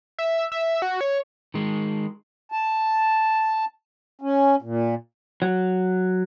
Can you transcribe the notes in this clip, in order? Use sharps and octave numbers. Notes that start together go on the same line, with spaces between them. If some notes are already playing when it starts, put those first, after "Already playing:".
E5
E5
F#4
C#5
D#3 G#3
A5
C#4
A#2
F#3